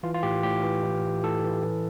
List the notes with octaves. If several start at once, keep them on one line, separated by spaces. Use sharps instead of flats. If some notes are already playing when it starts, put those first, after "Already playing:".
E3 F4
F4
A2 G4
A2 G4
E3
E3
A2
A2 A4
E3
E3